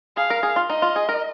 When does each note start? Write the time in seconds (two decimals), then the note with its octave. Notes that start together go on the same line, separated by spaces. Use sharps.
0.17 G#4 F5
0.30 A#4
0.43 G#4
0.56 F4
0.69 D#4 D#5
0.82 F4
0.96 G#4
1.09 A#4